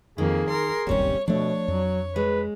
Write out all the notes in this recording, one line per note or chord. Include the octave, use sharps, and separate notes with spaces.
F2 D#3 A#3 G#4
A#4 C6
D1 G1 D#2 C3 G3 C#4 C#5
B2 F3 A3 D4 C#5
F2 F#3
G#3 B4